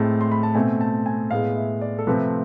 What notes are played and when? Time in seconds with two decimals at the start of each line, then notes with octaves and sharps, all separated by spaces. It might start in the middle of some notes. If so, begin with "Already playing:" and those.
Already playing: A2 G#3 C4 A5
0.21 C6
0.31 B5
0.43 A5
0.55 B2 A3 C4 G#5
0.81 A5
1.06 G#5
1.31 A2 G#3 B3 F5
1.56 E5
1.81 D5
1.99 A4
2.07 C3 F3 A3 C4 B4